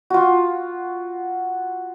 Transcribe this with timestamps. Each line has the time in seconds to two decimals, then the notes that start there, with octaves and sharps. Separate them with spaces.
0.10 F4 F#4